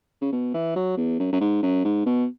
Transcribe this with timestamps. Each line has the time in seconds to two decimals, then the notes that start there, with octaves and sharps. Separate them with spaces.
0.21 C#3
0.32 B2
0.54 E3
0.75 F#3
0.97 E2
1.19 F#2
1.32 F#2
1.41 G#2
1.62 F#2
1.85 G#2
2.06 B2